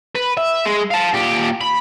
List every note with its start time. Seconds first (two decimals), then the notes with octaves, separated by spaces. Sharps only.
0.15 B4
0.37 E5
0.66 G#3
0.91 F5 A5
1.14 A#2 G4
1.61 B5